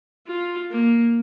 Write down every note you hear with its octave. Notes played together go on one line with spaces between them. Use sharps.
F4
A#3